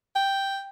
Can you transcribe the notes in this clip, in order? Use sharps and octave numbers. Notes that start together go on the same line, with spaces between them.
G5